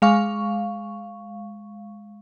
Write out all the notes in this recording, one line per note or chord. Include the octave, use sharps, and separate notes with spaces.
G#3 F5 C#6